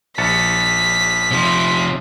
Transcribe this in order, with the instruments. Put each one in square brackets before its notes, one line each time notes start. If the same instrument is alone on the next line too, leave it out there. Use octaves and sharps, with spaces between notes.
[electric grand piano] A#1 A6 C#7 [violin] B6
[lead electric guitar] C3 F3